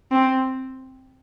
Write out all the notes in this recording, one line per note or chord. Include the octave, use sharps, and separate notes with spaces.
C4